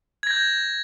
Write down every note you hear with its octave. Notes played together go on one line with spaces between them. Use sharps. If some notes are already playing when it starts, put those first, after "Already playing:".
G6 G#6 A#6